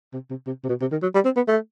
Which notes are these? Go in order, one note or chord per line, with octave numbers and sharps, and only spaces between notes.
C3
C3
C3
C3
B2
C3
D#3
F#3
G3
C4
B3
A3